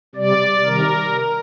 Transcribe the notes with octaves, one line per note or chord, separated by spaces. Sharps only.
C3 G3 D5
C3 D#3 G3 A#4